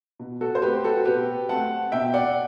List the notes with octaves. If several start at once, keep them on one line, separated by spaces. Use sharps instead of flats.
B2
F#4 A4
C5
A3 C4 G4 B4
F#4 A4
B2 G4 B4
A3 C4 F#5 A5
B2 E5 G5
D5 F#5